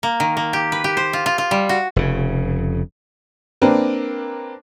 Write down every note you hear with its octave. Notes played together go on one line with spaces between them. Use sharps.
A#3
D#3
A#3
G4
B4
G4
C5
F4
F4
F4
G3
F#4
F1 C#3
A#3 C4 D4 A#4 B4